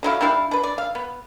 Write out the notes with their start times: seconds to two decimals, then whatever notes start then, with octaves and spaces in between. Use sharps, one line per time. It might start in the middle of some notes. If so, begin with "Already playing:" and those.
0.03 D3 F#3 E4 F5
0.21 G3 D4 E4 F5
0.51 D4 B4
0.63 D5
0.78 F5
0.95 B3